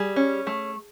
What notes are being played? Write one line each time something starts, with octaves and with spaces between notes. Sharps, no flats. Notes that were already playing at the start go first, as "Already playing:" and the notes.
Already playing: G3 G#4
C#4
A3